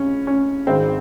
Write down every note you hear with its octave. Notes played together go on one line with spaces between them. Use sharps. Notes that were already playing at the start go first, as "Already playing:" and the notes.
Already playing: C#2 C3 C#4
C#4
G#1 G#2 D#3 G#3 C4